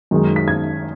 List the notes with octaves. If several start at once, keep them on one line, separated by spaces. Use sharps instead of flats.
F#2 D#3 G#3 D#4
B6
G#6